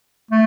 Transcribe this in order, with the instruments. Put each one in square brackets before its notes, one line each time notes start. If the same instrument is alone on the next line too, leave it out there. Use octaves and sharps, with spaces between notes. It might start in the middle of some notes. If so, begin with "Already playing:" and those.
[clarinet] A3